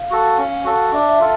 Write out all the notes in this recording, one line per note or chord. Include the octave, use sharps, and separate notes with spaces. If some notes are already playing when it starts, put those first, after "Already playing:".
Already playing: F5
F#4 A4
C#4
F#4 A4
D4 E5
F4 A4